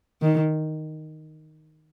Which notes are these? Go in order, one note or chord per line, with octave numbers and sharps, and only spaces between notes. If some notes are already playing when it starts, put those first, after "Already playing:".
D#3